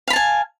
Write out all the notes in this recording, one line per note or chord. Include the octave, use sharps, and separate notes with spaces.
F5 G#5 A5 B5